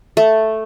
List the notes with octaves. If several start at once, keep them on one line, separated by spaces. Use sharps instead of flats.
A3